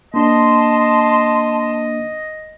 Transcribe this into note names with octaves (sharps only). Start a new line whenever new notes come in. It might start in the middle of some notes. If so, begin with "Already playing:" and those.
A#3 D4 D#5 A5 C6